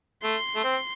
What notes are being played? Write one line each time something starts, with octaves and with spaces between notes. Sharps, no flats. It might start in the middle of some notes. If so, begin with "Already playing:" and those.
A3 C6
A3
C4